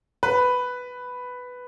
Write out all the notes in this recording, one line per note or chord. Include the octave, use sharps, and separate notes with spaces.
B4